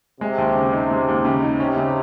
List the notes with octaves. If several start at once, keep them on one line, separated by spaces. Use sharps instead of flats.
C3 G#3
D#2
C#3
D#4
G#3
D#2
C#3
D#4
C3 C#4
C#3